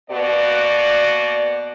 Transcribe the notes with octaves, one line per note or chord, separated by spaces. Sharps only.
B2 A#3 F#4 D5